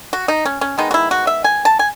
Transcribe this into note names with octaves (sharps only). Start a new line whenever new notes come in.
F#4
D#4
C#4
C#4
D#3 G#3 B3 D#4
F#4
E4
F#4
E5
G#5
A5
G#5